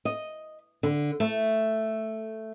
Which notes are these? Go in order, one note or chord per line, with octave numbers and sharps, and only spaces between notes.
D#5
D3
A3